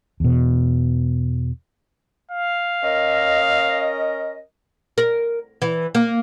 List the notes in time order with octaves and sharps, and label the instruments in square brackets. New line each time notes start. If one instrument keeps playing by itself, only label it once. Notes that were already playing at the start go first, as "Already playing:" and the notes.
[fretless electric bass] E2 B2
[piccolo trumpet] F5
[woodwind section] C#4 A#4 D#5
[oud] A#4
E3
A#3